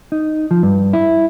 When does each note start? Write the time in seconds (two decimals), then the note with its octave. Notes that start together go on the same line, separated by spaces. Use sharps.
0.12 D#4
0.51 F3
0.63 G2
0.93 E4